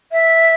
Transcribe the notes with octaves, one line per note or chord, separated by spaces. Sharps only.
E5